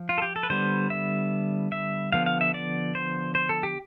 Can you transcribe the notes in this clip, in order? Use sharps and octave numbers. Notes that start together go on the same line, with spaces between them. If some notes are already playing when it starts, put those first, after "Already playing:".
Already playing: F3
F4
A4
G4
A4
B4
D3 G3 B3 C5
E5
E5
D3 F3 B3 F5
F5
E5
D5
C5
C5
A4
G4